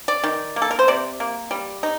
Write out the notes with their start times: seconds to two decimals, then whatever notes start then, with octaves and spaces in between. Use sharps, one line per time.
0.08 D5
0.24 D#3
0.56 A#3
0.62 A4
0.71 A#4
0.79 C5
0.88 C3 D5
1.20 A#3
1.51 G3
1.83 D#4